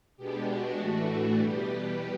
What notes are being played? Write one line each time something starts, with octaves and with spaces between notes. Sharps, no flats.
B2 G#3 B3 D4 G4
F#4
A2 E3 A3 D4 F#4
E2 B2 G3 B3 G4